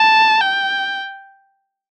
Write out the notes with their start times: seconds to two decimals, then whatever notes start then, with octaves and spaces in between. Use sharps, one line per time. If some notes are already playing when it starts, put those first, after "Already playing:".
Already playing: A5
0.41 G5